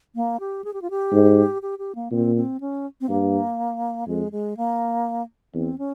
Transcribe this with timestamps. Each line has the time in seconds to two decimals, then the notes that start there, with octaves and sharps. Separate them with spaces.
0.15 A#3
0.40 G4
0.64 G#4
0.73 G4
0.82 F4
0.90 G4
1.13 G#2
1.62 G4
1.79 G4
1.95 A#3
2.11 A#2 C4
2.36 C4
2.60 C#4
3.01 C4
3.09 G2 A#3
4.07 F2 G#3
4.32 G#3
4.57 A#3
5.54 E2 C4
5.78 C#4